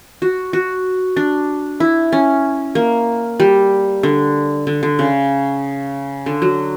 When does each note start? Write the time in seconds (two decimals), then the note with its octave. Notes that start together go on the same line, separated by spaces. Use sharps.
0.22 F#4
0.53 F#4
1.16 D4
1.80 E4
2.12 C#4
2.75 A#3
3.40 G3
4.03 D3
4.67 D3
4.83 D3
4.99 C#3
6.26 D3
6.42 F#3